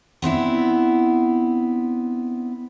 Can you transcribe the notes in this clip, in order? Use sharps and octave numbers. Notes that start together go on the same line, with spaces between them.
B3 C4 D4 E4